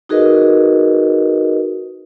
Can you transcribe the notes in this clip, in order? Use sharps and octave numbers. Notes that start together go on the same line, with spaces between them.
D#4 F#4 G#4 A#4 B4 D#5